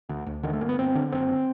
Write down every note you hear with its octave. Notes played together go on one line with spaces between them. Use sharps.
D2
D2
D3 D#3
A3
G1 A#3
B3
G1 C4
D3
F#1 C4